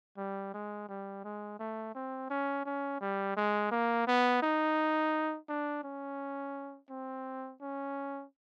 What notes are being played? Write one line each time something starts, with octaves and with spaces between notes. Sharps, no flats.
G3
G#3
G3
G#3
A3
C4
C#4
C#4
G3
G#3
A#3
B3
D#4
D4
C#4
C4
C#4